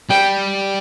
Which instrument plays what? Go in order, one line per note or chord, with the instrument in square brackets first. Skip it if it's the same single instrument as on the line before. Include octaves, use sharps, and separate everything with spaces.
[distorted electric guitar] G3 [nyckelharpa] G5